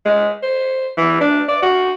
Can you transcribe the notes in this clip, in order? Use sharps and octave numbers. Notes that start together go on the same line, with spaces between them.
G#3
C5
E3
D4
D5
F#4